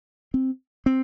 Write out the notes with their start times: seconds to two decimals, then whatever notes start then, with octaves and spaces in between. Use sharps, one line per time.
0.34 C4
0.86 C4